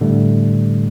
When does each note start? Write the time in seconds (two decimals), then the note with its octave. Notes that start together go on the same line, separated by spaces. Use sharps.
0.01 A2 D3 G3 A3